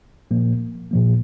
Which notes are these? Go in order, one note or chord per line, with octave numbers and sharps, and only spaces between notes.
A#2 F3 A#3
A#2 F3 A#3